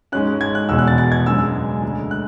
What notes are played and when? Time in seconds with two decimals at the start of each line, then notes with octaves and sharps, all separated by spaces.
0.12 G#2 G#3 C#4 F#6
0.41 G#6
0.55 F#6
0.69 E2 B2 G#3 E6
0.79 F#6
0.88 A6
0.98 A6
1.12 G#6
1.26 F#2 C#3 G#3 D4 E6
1.83 D2 D3 G#3
2.11 F#6